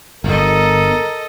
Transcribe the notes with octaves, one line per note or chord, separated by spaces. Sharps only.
G1 A4 A#4 D#5